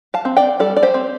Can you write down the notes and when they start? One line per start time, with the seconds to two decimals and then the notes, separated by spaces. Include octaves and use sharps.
0.14 F5 A5
0.25 C4
0.36 D5 G5
0.59 G3 A4 D5
0.76 D5
0.83 G4 C5
0.94 C4